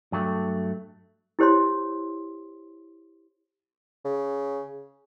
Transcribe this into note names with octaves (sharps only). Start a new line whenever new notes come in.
G2 F#3 A3
E4 G4 C5 C#5 C6
C#3